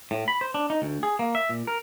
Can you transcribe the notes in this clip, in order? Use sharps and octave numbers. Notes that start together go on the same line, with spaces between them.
A2
B5
C5
D4
D#4
D2
G#4
A#3
E5
A#2
A#4